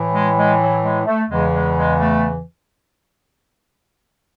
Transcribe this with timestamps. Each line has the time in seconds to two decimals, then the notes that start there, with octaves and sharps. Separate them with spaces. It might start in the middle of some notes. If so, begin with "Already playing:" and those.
Already playing: A2 E3
0.12 G#3
0.36 G#3
0.59 F#3
0.82 G#3
1.05 A3
1.28 E2 C#3 E3 G#3
1.52 G#3
1.75 G#3
1.99 A3